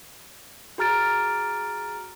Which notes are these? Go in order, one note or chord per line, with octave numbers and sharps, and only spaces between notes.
F#4 G#4 A#5 F6 A6 D7